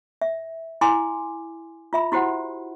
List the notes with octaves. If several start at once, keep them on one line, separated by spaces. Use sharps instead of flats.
E5
E4 G#5 C6 D6
F4 E5 B5
E4 F#4 G4 C5 F#5